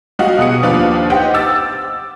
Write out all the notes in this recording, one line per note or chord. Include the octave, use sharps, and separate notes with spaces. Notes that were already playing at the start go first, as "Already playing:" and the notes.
G3 F#4 D#5 F5
B2 G#4 D#6 C#7
D#2 F3 D4 B4 F5 D6
D#4 G4 C5 D#5 F#5 G5
D6 E6 A6